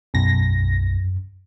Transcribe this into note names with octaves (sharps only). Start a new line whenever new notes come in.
B1 F#2 A#6